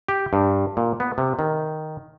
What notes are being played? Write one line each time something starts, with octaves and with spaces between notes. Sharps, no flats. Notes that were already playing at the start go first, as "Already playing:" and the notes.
G4
G2
A#2
B3
C3
D#3